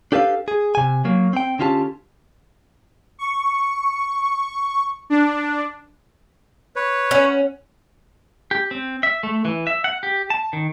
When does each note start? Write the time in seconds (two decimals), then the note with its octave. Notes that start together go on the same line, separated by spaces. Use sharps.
0.12 D4 G4 A4 B4 E5 F5
0.48 G#4
0.75 C3 G#5
1.05 F#3 A#3
1.33 C4 G5
1.59 D3 C#4 F4 G4 G#5 A5
3.19 C#6
5.10 D4
6.76 B4 C#5
7.11 C#4 F#5
8.51 G4
8.71 C4
9.03 E5
9.23 A3
9.45 E3
9.67 E5
9.84 F#5
10.03 G4
10.30 A5
10.53 D#3